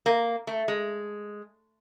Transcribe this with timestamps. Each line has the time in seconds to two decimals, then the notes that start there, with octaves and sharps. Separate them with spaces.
0.06 A#3
0.47 A3
0.68 G#3